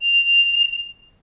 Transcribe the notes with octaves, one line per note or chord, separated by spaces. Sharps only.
F7